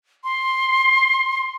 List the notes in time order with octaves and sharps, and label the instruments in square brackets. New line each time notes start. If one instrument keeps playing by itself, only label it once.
[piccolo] C6